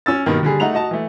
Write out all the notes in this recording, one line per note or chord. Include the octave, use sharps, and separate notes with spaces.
C#4 E6 A6
G2 B2 D#3 A#3
D3 G3 G#4
A3 D#4 F#5 A#5 F7
F#4 D#5 A5
E3 A3